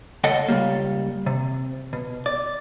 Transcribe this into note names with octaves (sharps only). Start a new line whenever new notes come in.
C#2 A4 D#5 F#5 G5 A5
C#2 G3 A#3
C3
B2
D5